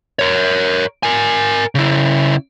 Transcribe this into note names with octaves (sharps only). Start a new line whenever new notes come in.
A#4 C#5
A#4 G#5
C#3 E4